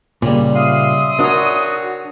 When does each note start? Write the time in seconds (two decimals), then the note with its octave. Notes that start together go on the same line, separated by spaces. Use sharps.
0.22 A#2 C#3 G3
0.55 E5 F5 C6 D#6
1.20 D4 F#4 A#4 C#5